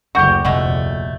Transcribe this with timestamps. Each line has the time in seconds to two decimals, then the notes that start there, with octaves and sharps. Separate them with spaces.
0.15 F#1 D2 F#4 G4 C#6 G6
0.45 F1 D2 A#2 G#3 A3 F#4